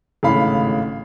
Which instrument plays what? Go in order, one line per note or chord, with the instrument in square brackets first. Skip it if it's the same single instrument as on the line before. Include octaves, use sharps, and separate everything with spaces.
[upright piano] G#1 A2 C#3 E3 F5 B5